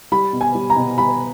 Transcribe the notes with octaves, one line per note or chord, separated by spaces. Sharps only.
G3 B5
B2
G#5
G3
A#5
B2
G3 B5